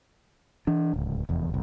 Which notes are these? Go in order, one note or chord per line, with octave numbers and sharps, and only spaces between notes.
E3 D4
D1 C#2
F1 E2
F#1 C2